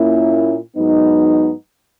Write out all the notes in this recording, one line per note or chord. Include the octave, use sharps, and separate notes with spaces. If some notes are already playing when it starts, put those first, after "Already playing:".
Already playing: A#2 A#3 C#4 E4
G#2 F#3 B3 D#4